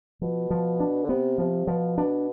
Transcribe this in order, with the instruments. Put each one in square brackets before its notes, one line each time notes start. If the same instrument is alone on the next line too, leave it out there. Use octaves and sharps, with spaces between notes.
[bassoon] B2 [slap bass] F3
[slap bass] F3
D4
[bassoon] D3
[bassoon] C3 [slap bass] B3
[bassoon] C3 [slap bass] F3
[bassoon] B2 [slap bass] F3
[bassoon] B2 [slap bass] D4